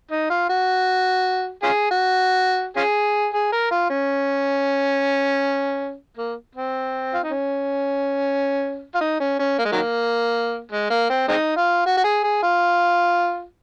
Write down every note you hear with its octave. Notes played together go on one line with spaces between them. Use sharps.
D#4
F4
F#4
C#4 F4 G#4
F#4
C#4 F4 G#4
G#4
A#4
F4
C#4
A#3
C4
F4
D#4
C#4
F4
D#4
C#4
C#4
A#3
G#3
D#3 F#3 A#3
G#3
A#3
C4
G#3 C4 D#4
F4
F#4
F#4
G#4
G#4
F4